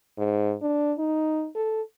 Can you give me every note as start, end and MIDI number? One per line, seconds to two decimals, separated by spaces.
0.18 0.54 44
0.62 0.93 62
0.98 1.48 63
1.55 1.82 69